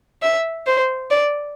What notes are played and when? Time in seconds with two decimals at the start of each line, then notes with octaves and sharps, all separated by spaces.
0.23 E5
0.67 C5
1.11 D5